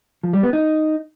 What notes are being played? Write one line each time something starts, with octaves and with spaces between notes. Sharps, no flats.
F3
G3
B3
D#4